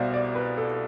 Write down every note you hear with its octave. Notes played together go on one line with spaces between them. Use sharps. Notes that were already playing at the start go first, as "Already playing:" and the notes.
Already playing: C2 B2 C5 D5 F5
D5
B4
A4